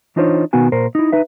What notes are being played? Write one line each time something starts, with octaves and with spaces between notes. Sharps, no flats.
E3 D4 D#4 F4 C5 C#5
B2 D#3 B3 F#4 G#5
A#2 A#4 C5
D#4 E4
D#4 B4 E5